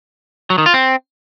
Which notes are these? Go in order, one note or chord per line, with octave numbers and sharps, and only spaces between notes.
F#3
D#3
F4
C4